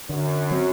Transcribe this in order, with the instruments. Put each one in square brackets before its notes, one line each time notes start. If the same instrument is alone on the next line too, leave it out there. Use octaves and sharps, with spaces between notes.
[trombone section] F#2 [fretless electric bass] D3
[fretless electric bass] F#3 C4